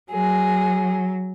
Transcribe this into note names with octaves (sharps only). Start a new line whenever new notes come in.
F#3 G#4